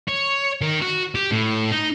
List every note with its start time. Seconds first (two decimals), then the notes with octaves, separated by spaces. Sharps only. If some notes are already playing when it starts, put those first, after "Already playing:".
0.09 C#5
0.61 D#3
0.82 F#4
1.15 G4
1.31 A2
1.71 D#4